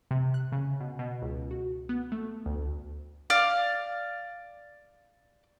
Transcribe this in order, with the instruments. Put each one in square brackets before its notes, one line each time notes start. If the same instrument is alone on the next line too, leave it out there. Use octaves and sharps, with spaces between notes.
[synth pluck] C3
F#6
C#3
B2
B2
C#2
F#4
B3
A3
D2
[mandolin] D5 F5 F6